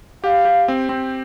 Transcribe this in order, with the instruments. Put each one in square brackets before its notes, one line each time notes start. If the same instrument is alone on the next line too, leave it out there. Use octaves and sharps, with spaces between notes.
[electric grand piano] G4 [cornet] F5
[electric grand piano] G4
C4
C4